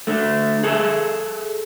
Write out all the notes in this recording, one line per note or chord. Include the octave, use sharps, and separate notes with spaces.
D3 A3
G#4 A4 E5